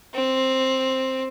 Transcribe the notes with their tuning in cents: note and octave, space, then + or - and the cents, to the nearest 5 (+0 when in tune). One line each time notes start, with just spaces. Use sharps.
C4 +5